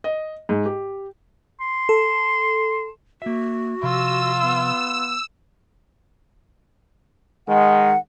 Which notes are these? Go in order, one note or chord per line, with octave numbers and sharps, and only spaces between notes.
D#5
G#2
G4
C6
A4
A#3 F#4 E5
C3 F3 F4 E6
B3
D#3 G#3 F#5